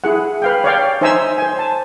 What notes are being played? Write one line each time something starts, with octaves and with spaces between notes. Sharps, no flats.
E4 G#4 F#5
B4 F5 G5
C#5 D5 F5 G5
D#4 C5 E5 G#5 A#5 E6
C5 G#5
A5